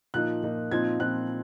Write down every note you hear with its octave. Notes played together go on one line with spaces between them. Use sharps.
A#2 F3 A#3 D#4 F#6
A#2 F3 A#3 D#4
A#2 F3 C4 D#4 G#6
A#2 F3 C4 D#4 F#6